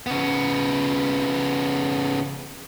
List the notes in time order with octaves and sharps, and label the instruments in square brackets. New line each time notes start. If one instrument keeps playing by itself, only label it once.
[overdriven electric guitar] C#3 B3